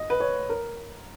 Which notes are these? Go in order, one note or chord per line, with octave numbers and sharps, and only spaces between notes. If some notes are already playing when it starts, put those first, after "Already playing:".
Already playing: D#5
B4
C#5
A#4